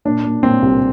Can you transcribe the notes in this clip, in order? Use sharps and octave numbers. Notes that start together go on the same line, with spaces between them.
A#2 D4
A#2
A#2 C4
C2